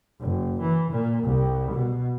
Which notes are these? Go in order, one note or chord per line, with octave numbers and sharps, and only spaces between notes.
F#1
E3
A#2
C2
B2